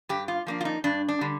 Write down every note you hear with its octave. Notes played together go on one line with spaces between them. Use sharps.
G2 G4
F4
F3 A#3 D4
F4
D#4
G2 D4
D4
D3 G3